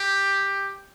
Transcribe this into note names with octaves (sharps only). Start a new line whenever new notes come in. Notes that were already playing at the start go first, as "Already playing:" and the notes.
Already playing: G4